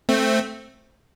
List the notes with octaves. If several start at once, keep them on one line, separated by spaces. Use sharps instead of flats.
A3 C4